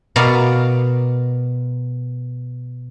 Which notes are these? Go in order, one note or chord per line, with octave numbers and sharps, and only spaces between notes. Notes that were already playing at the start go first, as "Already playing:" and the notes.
B2 B3 A#4 D5 F5